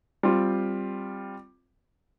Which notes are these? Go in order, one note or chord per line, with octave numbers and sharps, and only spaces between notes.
G3 C4 F4